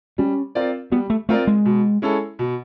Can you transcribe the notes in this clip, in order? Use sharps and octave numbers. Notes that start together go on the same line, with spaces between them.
G3 C#4
C4 F4 A#4 D5
G3 B3
A3
A3 C4 F4 A#4 D5
G#3
B2
G#3 C#4 E4 A4
B2